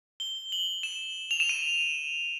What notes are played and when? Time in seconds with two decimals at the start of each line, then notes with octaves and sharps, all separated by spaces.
0.20 G7
0.52 F#7
0.83 E7
1.31 F7
1.40 E7
1.49 D#7